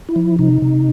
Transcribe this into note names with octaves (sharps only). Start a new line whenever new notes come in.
E4
F3
C3 D#4
C3